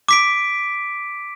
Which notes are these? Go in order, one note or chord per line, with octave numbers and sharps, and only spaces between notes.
D6 B6 D7